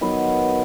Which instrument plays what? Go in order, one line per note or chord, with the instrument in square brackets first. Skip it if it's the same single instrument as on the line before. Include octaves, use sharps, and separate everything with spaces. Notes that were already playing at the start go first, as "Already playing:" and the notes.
[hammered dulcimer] D#3 F#3 B3 B4